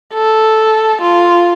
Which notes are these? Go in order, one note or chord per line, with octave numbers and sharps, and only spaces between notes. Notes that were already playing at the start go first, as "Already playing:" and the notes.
A4
F4